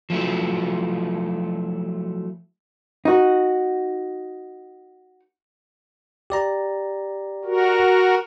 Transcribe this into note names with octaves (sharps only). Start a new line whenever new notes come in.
F3 F#3 A3 E4
D#4 F#4
G4 D5 A#5
F#4 A#4